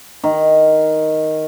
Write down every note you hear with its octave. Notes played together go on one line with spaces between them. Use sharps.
D#3